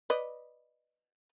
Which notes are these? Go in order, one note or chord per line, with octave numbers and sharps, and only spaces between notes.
B4 D5 D#5